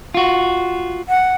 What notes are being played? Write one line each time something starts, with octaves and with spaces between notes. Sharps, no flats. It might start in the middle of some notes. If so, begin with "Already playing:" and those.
F4 F#4
F#5